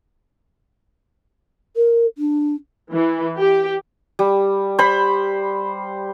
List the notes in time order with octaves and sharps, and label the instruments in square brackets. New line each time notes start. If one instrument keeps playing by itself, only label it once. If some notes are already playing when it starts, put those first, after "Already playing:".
[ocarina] A#4
D4
[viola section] E3
G4
[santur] G3
C5 B5